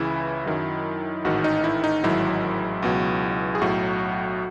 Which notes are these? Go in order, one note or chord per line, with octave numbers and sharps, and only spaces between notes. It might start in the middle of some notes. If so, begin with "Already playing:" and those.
Already playing: C#2 C#3 E3 E4
F#2 D#3 F#3
A1 G#2 D#3 F#4
D#4
E4
D#4
A1 G#2 D#3 F#3 E4
C#2 B2 F#3
G#4
B1 A2 F#3 F#4